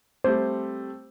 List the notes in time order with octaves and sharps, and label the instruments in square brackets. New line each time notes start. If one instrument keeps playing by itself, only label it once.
[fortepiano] G3 A3 C4 [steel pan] C5